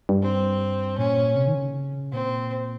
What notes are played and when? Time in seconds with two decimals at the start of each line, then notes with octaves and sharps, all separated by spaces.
0.09 G2
0.22 C4
0.98 A#2 C#4
1.36 C3
1.48 D#3
1.55 C#3
2.12 A#2 C4